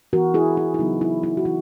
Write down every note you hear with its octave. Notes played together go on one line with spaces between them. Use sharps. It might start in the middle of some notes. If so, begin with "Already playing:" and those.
E3 B3 F#4 A#4
E4 G#4
E4
E4
C#3 F#3 B3 D#4
E4
E4
F#4
E3 E4